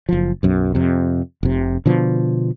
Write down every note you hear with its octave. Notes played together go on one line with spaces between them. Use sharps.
F#1 F3
B1 F#2
F2 C3
F1 C3
B2 D3 F3